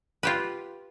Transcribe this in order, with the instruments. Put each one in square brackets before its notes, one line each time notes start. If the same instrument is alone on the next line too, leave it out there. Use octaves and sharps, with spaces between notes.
[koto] F4 G4 B4